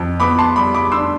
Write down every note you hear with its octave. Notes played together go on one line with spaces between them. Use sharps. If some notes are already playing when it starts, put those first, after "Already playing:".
Already playing: F2
B3 B5 D6
A5 C6
G3 B5 D6
B5 D6
D4 C6 E6